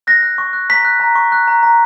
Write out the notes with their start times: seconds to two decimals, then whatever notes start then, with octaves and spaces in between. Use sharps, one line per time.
0.07 F#6 A#6
0.23 F#6
0.38 C#6
0.53 F#6
0.69 A#5 B6
0.85 F#6
1.00 A#5
1.15 C#6
1.32 F#6
1.48 A#5
1.63 A#5